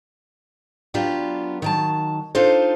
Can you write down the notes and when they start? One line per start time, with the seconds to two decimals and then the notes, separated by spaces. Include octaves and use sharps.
0.94 F#3 B3 D4 F4 G4 D5
1.62 D#3 F#3 A5
2.35 D4 D#4 F4 A4 C5